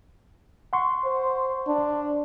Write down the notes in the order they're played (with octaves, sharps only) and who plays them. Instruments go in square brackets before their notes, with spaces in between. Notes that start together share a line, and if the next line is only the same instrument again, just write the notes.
[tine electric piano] F#5 C6 C#6
[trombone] C5
D4